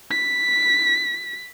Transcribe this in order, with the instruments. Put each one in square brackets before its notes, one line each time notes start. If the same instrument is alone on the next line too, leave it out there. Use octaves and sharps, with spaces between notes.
[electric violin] B6